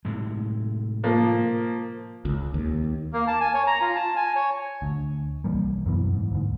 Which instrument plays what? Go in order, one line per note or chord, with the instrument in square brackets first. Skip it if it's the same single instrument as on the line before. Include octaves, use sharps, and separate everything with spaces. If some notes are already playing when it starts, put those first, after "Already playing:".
[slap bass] A2 C3 G#3
[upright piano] F3 A#3
[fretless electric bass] C#2
D#2
[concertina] A#3
A5
G#5
C#5
A#5
F4
A5
G#5
C#5
[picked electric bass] D2
C2 E3 G3 A#3
F#2 B2 E3
G#2
D2 G#2